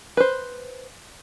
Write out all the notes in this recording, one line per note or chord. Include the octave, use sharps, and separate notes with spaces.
B4 C5